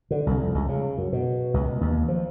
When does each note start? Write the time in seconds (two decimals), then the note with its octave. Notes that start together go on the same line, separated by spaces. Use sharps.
0.11 D3
0.26 C2
0.42 F2
0.55 C#2
0.69 C#3
0.98 F#2
1.13 B2
1.54 C#2
1.67 B2
1.81 D#2
2.08 F3